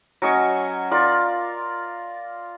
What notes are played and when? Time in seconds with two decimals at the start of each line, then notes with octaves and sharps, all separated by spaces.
0.22 F#3 C#4 D#5 C#6
0.91 F4 A#4 D5